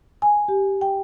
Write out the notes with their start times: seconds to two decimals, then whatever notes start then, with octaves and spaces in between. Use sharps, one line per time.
0.22 G#5
0.48 G4
0.81 G5